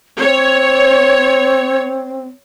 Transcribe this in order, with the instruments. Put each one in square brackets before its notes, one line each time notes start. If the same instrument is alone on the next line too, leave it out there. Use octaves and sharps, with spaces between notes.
[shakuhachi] C4 [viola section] C#5